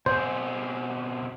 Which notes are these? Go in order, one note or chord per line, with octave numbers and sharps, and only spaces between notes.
B2 C4 G#4 C5